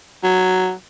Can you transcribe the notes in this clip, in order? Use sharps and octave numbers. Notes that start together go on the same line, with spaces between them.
F#3